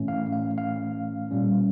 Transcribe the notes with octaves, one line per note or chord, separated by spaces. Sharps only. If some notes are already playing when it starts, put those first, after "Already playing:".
Already playing: A2 E3 A3 C#4
F5
F5
F5
A#2 G3 C#4